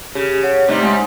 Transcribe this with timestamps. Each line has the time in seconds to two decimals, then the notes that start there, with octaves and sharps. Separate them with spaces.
0.15 C#3 G4
0.43 C#5 F#5
0.68 C3 G3 A3 D#4
0.83 G#2 C6